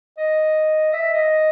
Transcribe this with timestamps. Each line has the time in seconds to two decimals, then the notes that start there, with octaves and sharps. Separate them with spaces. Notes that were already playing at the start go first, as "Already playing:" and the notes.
0.18 D#5
0.93 E5
1.13 D#5